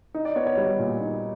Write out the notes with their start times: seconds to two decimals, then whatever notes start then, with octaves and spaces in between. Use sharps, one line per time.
0.14 D#4
0.25 D5
0.36 B3 C#5
0.47 C#5
0.57 G3 C#5
0.79 A#2
1.01 D#4